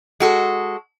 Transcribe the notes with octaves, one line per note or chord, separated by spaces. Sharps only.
G#3 F#4 A4